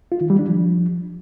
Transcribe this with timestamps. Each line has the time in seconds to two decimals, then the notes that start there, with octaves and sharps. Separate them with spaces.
0.12 F4
0.21 D#3
0.30 G3
0.39 D4
0.48 F3